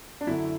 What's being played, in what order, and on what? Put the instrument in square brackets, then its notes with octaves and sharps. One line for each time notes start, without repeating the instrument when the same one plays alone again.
[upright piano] D4
F#2 D3 F#3 E4